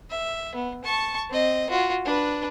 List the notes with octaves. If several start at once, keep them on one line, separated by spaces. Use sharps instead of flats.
E5
B3
A5 C#6
C4 D#5
F4 F#4
D4 B4